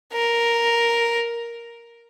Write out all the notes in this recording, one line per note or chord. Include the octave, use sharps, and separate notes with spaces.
A#4